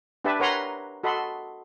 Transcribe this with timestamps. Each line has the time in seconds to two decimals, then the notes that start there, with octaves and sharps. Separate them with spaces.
0.24 D4 G4 B4 E5 A5
0.39 A#4 B4 C#5 F#5 A#5 C6
1.03 F#4 A4 D#5 B5 C6